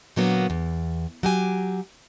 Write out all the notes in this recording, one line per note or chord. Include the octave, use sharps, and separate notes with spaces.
A#2 D3 F#3 A#3 B3 F#4
E2
F#3 G4 G#5